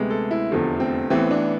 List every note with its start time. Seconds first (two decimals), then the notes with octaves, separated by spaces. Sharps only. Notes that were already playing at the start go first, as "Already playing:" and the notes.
Already playing: D2 C3 G#3 B3
0.10 A4
0.31 E4
0.51 F1 E2 D3 F3 A3
0.80 C4
1.10 A1 A2 E3 B3 C4
1.31 D4